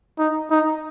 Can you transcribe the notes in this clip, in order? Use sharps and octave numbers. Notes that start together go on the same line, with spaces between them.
D#4
D#4